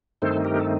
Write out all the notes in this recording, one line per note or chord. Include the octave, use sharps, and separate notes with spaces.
G2 D#3 A3 C4 D#4 A4 C5
G4 A#4
A4